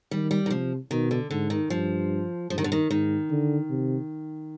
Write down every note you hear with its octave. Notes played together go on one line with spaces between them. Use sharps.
D#3 G3
G3
D#3
C3 F3
B2 D#3
D3
G#2 D3
D#3
G2 F3
G2 F3
D#3
D3
D#3
G#2 D#3
D3
C3